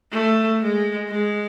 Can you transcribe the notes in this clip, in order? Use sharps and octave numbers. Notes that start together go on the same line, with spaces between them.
A3
G#3
G#3